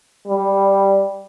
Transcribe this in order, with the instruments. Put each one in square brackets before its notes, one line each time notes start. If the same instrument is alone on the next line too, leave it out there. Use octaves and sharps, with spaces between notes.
[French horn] G3